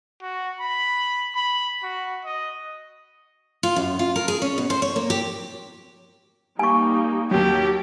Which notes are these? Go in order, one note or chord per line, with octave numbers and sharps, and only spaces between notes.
F#4
B5
B5
F#4
D#5
F4
F#2
F4
A#4
G#4
C#4
B2
C5
C#5
A#3
G4
G3 A#3 D#4 G#5 C#6
D#2 F#3 G4